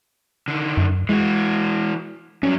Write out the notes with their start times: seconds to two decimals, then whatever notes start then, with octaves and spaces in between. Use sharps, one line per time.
0.48 D3 D#3
0.77 F#2
1.09 E3 G#3 F#4
2.43 G2 F#3 C#4